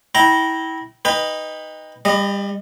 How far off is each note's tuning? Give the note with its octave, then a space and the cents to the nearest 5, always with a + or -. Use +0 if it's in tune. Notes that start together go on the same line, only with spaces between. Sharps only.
E4 -25 G5 -25 A#5 +0
D#4 +0 B4 +0 G5 +25
G3 +30 D#5 -15